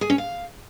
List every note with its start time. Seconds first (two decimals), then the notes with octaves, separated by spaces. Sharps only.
0.01 G#4
0.10 C#4
0.18 F5